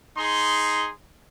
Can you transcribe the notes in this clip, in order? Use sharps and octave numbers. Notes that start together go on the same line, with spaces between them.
D#4 G#4 C6